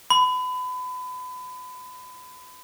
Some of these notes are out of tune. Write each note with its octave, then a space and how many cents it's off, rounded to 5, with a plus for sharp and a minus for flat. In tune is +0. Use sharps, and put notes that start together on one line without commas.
B5 +30